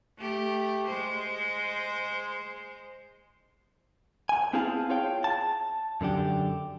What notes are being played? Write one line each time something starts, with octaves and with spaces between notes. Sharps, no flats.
A3 G4
G#3 C5
G#5
B3 C4 E4 G#4 F5 A5
F4 G#4 C#5 F5 G5
A5
F#2 D3 D4 G4